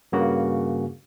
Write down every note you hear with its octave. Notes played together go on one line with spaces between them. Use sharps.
G2 C#3 A#3 F#4